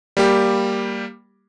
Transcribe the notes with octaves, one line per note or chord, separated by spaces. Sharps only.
G3 A#3 G4